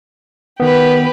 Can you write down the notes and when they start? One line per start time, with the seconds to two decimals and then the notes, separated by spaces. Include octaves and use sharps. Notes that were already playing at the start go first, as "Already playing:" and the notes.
0.60 D#3 B3 G4 B4